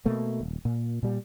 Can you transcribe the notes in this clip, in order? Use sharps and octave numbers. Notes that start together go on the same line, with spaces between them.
B2 A3 A#3
D#1
A#2
A#2 G3